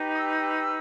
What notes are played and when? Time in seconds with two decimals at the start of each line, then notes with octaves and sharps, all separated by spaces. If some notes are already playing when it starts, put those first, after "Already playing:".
Already playing: D#4 G4 B4
0.15 D#6
0.19 E6